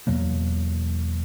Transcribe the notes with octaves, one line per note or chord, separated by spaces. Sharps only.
E2 B2 F#3 A#3